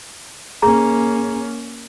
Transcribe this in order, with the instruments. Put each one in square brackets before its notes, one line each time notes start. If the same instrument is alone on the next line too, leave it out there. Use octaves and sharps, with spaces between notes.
[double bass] A#3 C#4 [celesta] G#4 A#5